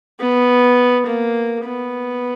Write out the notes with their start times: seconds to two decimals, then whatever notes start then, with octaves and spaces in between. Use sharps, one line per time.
0.20 B3
1.06 A#3
1.64 B3